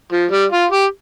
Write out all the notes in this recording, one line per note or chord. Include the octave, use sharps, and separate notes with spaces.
F3
G3
F4
G4